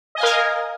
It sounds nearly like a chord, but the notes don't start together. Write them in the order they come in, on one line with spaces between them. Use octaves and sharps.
D#5 G#5 F5 A#4